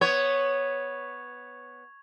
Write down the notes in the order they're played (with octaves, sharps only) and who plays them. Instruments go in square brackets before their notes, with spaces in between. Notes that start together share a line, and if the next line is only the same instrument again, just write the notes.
[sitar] B3 C#5 [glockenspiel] C#6 G#6 F7